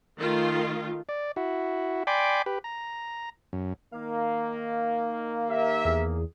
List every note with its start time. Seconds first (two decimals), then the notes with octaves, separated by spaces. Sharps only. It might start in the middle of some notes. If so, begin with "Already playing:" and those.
0.19 D#3 A3 F4
1.09 D5
1.36 E4 F#4
2.07 D5 G5 G#5 B5 C6 D6
2.46 G4 B4
2.64 A#5
3.53 F#2
3.92 D#3 A#3 F5
5.49 G4 A#4 E5
5.85 E2 G#4